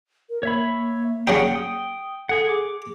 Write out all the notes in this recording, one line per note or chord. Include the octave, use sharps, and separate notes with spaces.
A#4
A#3 C#5 E5 B5
C#3 F#3 D#4 F#5 G5
G5 D#6
G#4 A4 F#5
G#4 D6